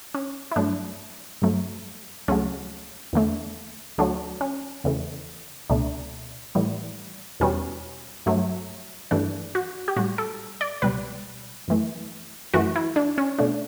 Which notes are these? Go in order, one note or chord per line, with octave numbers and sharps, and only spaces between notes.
C#4
E4
G2 F#3 A3 D4
G2 F#3 A3
C#2 C#3 F#3 A3 C#4
E2 D3 A3
D2 D3 F#3 A3 D4
C#4
E2 C#3 E3 A3
C#2 B2 A3 D4
A2 E3 G3
E2 B2 G3 C#4
G2 F#3 A3
G2 E3 A3 D4
F#4
G4
A2 G3 F#4
A4
D5
C#2 B2 G3 B4
F#2 E3 A3
F#2 E3 A3 F#4
E4
D4
C#4
B2 A3 D4